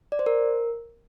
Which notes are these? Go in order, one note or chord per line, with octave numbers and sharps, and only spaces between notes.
D5
C5
A#4